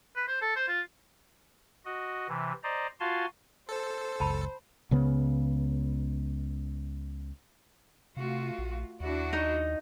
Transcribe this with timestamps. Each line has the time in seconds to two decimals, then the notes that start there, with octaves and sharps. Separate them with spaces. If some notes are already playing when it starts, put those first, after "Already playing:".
0.16 B4
0.28 C5
0.42 A4
0.56 C5
0.68 F4
1.85 F#4 D#5
2.28 C3 E3
2.63 C5 D5 D#5 A#5
3.00 F4 F#4 F5 G#5 A5 C6
3.69 A4 C5
4.20 F#1 C#2 G5 A5 B5
4.91 C#2 C#3 B3
8.17 C3 A3 F4 F#4
8.59 A#1
9.00 D#2 D4 E4 F#4
9.33 D#4 D#5